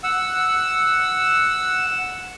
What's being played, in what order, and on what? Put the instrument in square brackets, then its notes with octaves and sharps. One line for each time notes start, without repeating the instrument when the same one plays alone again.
[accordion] F#5 E6